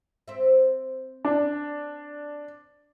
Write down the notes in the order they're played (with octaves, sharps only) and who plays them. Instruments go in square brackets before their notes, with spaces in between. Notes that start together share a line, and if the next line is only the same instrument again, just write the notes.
[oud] C4 E5
[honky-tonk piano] D4